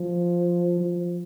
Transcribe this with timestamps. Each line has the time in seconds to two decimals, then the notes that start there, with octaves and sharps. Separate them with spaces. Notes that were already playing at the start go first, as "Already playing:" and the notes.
Already playing: F3
0.80 F3